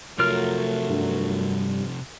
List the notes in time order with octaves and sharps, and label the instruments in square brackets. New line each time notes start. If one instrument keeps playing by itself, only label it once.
[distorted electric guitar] C3 F3 [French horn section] F#3 A3 [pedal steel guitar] F4 A#4 F6
[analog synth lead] G2